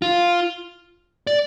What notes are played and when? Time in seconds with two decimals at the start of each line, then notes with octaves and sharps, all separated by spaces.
0.02 F4
1.27 D5